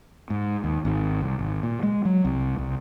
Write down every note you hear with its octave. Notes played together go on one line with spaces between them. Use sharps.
G#2
D#2
G#1
C2
G#1
A#2
G#3
F#3
C2
C2